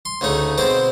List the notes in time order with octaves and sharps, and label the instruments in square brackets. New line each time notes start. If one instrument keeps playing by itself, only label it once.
[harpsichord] C6
D2 C#3 A3 D#4
B2 G#3 C4 C5 D6